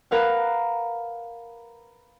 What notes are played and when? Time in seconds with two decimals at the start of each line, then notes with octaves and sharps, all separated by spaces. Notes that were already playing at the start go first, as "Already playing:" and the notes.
0.11 A#4 B4 F5 F#5